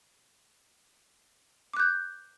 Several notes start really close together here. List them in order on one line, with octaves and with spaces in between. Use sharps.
D6 F#6 G6